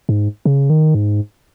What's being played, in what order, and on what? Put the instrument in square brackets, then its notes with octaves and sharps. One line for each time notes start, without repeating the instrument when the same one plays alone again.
[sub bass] G#2
C#3
D#3
G#2